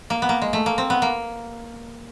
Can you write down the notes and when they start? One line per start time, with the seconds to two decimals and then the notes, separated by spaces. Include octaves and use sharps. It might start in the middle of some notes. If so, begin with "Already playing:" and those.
0.10 A#3
0.22 B3
0.29 A#3
0.42 G#3
0.53 A3
0.66 A#3
0.78 C4
0.90 B3
1.02 A#3